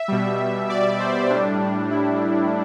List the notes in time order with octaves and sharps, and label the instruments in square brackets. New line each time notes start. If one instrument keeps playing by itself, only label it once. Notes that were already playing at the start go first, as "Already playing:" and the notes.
Already playing: [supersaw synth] E5
B2 G3
D5
C5
A2 G3 D4
D4
E4